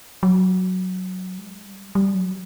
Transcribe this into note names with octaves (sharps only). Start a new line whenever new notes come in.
F#3
G#3
G3
G3
F#3